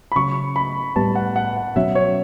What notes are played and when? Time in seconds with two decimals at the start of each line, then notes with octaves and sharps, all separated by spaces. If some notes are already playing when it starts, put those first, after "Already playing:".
0.12 B5
0.16 C#3 F#3 C#4 C#6
0.56 B5
0.96 A2 G3 B3 A5
1.15 F#5
1.36 F#5
1.56 F#5
1.76 B2 F#3 C#4 E5
1.95 C#5